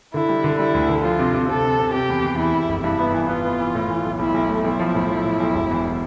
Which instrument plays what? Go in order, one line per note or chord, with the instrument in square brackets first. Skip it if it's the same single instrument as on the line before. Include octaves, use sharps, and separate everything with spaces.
[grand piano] D3 [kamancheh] E4
[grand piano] G3
D3
[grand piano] G3 [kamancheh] E4
[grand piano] D2
D3
[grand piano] F3 [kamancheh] F4
[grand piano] C3
C3
[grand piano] C3 [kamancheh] A4
[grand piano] C3
C3
[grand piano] C3 [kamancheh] G4
[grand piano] E2
E2
[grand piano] E2 [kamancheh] E4
[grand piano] E2
F1
[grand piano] G2 [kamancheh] E4
[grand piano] B3
E3
[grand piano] B3 [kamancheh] F4
[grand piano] B3
E3
A2
E3
B1
[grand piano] B1 [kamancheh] E4
[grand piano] B1
A3
[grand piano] B1 [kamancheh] E4
[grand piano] F3
A2
F3
A2
B1
E1
E2